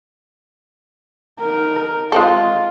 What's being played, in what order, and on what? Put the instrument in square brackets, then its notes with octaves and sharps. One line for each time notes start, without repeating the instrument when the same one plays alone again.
[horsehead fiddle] D#4 A#4
[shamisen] G#3 C4 A4 [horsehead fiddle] F4